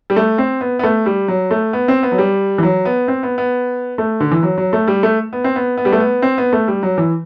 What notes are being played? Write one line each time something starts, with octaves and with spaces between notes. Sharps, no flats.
G3
A3
C4
B3
B3
A3
G3
F#3
A3
B3
C4
B3
F#3
G3
E3
F#3
B3
C4
B3
B3
A3
D3
E3
F#3
F#3
A3
G3
A3
B3
C4
B3
B3
G3
A3
B3
C4
B3
A3
G3
F#3
E3